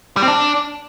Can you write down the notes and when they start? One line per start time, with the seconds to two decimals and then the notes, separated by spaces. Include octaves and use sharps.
0.17 G3
0.22 C4
0.28 D4